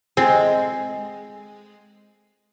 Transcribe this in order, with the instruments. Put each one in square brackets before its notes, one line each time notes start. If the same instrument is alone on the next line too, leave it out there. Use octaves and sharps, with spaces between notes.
[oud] G#3 [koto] C4